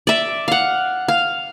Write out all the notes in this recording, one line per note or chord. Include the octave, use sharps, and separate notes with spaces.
D5 E5
F5 F#5
F5